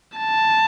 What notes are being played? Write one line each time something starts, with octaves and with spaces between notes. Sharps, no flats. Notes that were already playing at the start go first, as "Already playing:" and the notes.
A5